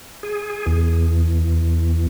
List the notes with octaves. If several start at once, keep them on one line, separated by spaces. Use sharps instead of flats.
G#4
E2